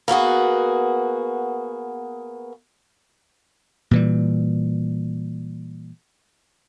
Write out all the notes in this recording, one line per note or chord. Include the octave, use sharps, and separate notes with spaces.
A#3 B3 F#4 G#4
A#2 E3 G3